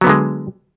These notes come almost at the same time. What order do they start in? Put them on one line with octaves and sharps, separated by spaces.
F#3 B3 D3 G#3